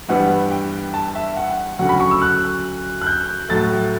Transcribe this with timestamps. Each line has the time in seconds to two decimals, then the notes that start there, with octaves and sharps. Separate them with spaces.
0.08 G2 E3 G3 B3 F#5
0.51 G5
0.94 A5
1.15 E5
1.37 F#5
1.79 D2 C#3 F#3 F#5
1.89 B5
2.00 C#6
2.11 E6
2.22 F#6
3.01 F#6
3.07 G6
3.49 A2 F#3 A3 A6